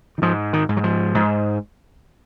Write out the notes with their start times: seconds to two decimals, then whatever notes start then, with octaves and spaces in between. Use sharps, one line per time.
0.18 D#3
0.22 G#2 F3
0.53 D#3
0.69 G#2
0.77 F#3
0.84 F3
1.15 G#2